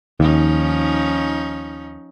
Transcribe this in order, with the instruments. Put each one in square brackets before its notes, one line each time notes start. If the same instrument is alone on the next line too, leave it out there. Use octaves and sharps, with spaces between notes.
[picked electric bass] D#2 [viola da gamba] F3 C#4 D#4